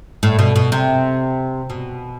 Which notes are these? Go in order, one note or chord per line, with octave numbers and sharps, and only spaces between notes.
A2
B2
B2
C3
B2